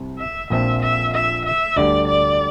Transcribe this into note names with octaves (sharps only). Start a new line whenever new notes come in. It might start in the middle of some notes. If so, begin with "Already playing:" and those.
Already playing: C2 C3
E5
A#1 A#2 F3 C4 E5
E5
E5
E5
D2 D3 G3 D5
D5